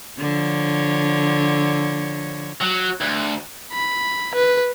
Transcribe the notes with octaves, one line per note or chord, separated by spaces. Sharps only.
D3 F3 C#5
F#3
D2
B5
B4